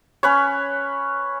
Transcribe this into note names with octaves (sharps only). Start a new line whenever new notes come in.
C#4 B4 C#5